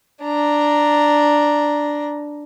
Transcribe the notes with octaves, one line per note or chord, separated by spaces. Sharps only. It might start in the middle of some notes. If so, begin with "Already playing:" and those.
D4 A#5